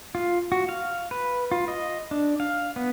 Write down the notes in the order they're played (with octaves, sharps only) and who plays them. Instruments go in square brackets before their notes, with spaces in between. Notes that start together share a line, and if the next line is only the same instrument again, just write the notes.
[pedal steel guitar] F4
F#4
F5
B4
F4
D#5
D4
F5
B3